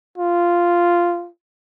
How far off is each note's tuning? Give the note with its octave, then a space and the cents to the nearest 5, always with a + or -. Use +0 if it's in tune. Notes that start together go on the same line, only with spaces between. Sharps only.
F4 -5